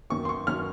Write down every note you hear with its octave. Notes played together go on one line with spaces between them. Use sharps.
F#2 D#3 F#3 C#6
C6
C#6
F#2 D#3 F#3 F6